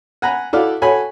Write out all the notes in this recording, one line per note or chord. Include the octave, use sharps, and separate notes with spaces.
F#5 G#5 A#5 B5
E4 F#4 A4 D5 F5
F#4 A4 C#5 G#5 B5